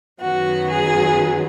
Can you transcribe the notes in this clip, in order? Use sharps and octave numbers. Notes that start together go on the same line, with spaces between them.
F#2 D#3 F#3 B3 F#4
G#4